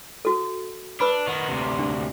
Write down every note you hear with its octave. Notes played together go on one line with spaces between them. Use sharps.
F#4 A4
D4 B4 B5 E6
D#3 B3
D2 C3
D4